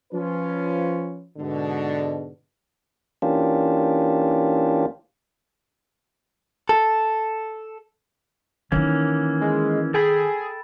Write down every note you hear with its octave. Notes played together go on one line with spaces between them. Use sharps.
F3 C#4 F4 B4
G#2 B2 D3
E3 A#3 C#4 D4 F4 G4
A4
D#3 E3 A#3 C#4 D#4
G#3
G#4 A4 G5 B5